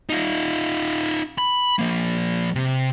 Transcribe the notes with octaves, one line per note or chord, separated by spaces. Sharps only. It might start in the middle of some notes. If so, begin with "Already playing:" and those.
D#4 F4
B5
F3 A#3
C3